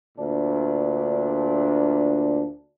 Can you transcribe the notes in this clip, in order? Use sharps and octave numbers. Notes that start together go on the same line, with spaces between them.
D2 A#2 D4